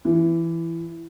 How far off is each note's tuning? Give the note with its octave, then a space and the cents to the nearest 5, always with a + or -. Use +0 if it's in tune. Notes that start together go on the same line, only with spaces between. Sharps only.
E3 +15